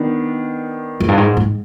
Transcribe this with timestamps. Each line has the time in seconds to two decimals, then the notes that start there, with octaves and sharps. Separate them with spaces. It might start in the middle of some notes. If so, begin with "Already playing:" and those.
Already playing: D#3 B3 D4
1.00 F2
1.08 G2
1.17 G#2
1.37 G#2